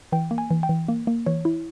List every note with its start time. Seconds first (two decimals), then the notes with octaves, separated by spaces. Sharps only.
0.12 E3 G5
0.31 A#3
0.38 G#5
0.51 E3
0.63 G5
0.69 E3
0.88 A#3
1.07 A#3
1.26 E3 C#5
1.45 E4